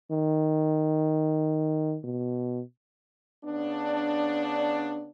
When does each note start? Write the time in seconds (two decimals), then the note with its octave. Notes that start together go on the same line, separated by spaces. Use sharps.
0.11 D#3
2.04 B2
3.44 C#3 B3 D4